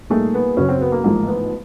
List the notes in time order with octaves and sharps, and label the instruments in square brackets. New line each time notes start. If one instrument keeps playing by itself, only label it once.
[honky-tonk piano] A#2 G3 A#3 D#4 G#4 [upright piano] A3
[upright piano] B3
[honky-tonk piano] F#2 C#3 F#3 [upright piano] C#4
[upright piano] C4
B3
A#3
[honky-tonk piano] A1 G#2 F3 G#3 [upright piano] A#3
[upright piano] B3